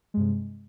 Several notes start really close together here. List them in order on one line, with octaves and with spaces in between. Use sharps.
G#3 G2 C3